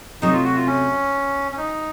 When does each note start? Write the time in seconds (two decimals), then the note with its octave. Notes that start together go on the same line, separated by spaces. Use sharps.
0.22 C3 F#3 A3 D#4
0.33 F4
0.44 F#4
0.56 F4
0.67 C#4
1.52 C#4
1.57 D#4